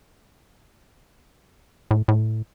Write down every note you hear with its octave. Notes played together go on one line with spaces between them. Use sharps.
A2
A2